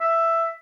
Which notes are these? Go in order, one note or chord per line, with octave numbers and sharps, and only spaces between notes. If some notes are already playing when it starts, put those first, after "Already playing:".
E5